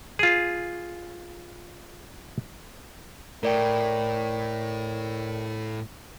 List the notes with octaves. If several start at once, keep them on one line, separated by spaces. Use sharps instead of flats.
F4 G#4
A2 A#4 D5 G5